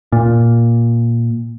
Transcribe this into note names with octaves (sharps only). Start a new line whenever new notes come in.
A#2